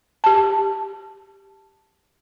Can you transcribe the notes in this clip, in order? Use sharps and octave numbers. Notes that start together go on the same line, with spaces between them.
G4 A5